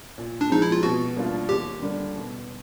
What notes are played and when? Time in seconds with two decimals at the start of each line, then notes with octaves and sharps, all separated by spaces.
0.18 A#2
0.41 D4
0.50 F3 G#3 C4 D#4
0.62 E4
0.72 F4
0.83 B2 F#4
1.16 G3 A#3 D4 F4
1.49 D#2 G4
1.82 D3 G3 A#3
2.16 B2